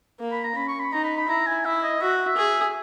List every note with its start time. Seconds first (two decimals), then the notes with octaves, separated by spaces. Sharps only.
0.20 A#3
0.32 B5
0.44 A#5
0.55 C#4 B5
0.68 C#6
0.80 B5
0.92 D#4 A#5
1.04 B5
1.17 B5
1.28 E4 A#5
1.46 G#5
1.65 E4 E5
1.83 D#5
2.01 F#4 E5
2.26 E5
2.37 G#4